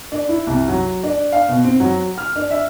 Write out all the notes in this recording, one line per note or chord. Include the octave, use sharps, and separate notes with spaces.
D4
E4
C2
F#3
D4
F5
B2
C4
F#3
F6
D4
E5